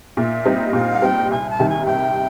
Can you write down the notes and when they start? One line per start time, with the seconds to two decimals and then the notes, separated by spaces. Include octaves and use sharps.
0.17 A#2 E5
0.45 G3 C4 D#4
0.73 A#2 F5
0.91 F#5
1.02 G3 C4 D#4 G5
1.30 C2 G#5
1.50 A5
1.59 C3 D#3 G3
1.68 G#5
1.87 C2 G5